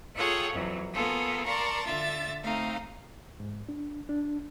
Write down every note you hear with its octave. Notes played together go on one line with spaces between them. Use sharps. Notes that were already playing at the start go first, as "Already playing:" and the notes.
F4 G#4 A4 C#5 F#5 G5
F2 E3 F#3
A#3 B3 F4 G#4 A4
A#4 D5 A5 C6 C#6
D3 F4 E5 A6
A3 C4 D#4 F5
G#2
D4
D4